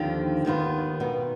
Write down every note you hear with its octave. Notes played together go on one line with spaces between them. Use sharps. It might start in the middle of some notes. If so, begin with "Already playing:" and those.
Already playing: D#2 D3 F3 C4
D#2 D#3 B3 F4
B2 B3 D#4